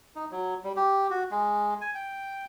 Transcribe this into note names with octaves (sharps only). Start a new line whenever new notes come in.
D#4
F#3
G3
G4
F#4
G#3
G#5
G5